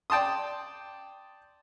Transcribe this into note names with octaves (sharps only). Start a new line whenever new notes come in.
D5 G5 A5 C6 D#6